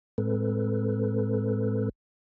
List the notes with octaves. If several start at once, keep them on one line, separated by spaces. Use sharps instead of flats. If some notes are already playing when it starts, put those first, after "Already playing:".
A2 G#3 C4 A4 B4